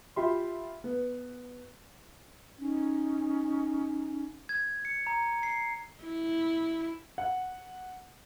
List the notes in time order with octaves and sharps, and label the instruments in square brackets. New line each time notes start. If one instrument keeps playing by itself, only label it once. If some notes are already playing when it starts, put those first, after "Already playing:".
[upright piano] F4 G4 E5 B5 C6
B3
[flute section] C#4 D#4
[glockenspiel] G#6
C#7
A#5
C7
[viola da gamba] E4
[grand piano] F#5